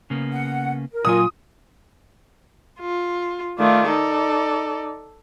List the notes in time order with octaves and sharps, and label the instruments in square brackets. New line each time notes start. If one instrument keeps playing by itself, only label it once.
[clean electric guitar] C#3 A#3 B3
[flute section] F#5
A#4
[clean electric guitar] A#2 F#3 G#5 [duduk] F4 [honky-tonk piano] D#6
[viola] F4
[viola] D#3 A3 [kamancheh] F4 D5
[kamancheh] D#4 D5 [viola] A4